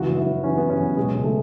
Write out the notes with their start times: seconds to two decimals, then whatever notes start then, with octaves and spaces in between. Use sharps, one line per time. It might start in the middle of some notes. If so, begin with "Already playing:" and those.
Already playing: C#2 E3 F#4
0.09 F#2
0.17 E4
0.26 F#2
0.44 E3 C#4
0.57 E3 B3
0.70 C#4
0.79 F#2 B3
0.97 B2 G#3
1.15 C#2
1.24 A3